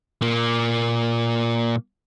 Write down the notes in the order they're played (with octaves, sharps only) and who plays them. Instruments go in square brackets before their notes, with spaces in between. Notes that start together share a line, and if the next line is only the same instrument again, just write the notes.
[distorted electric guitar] A#2 A#3